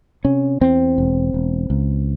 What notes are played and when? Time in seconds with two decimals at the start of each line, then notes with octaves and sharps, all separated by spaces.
0.25 C3 C#4
0.61 E2 C4
0.98 E1
1.34 E1
1.70 C#2